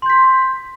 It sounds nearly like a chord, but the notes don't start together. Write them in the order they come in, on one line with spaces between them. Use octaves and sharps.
C6 G6 B6